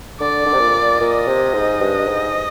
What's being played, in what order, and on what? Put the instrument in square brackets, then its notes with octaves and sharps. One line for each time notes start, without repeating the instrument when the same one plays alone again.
[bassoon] D3 [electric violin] D5
[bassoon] D3
C3
A#2
[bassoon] A#2 [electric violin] D#5
[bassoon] C3
G#2
G2
G#2